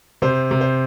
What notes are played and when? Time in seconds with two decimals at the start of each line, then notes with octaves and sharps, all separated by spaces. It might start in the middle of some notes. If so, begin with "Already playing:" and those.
0.22 C3 C5
0.51 C3
0.61 C5